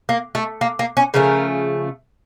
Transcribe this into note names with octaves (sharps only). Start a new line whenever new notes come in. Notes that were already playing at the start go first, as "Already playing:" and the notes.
A#3
A3
A#3
A#3
C#4
C#3 F3 A3 A#4